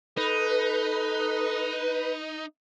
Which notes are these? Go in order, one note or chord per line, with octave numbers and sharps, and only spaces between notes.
D#4 A4 B4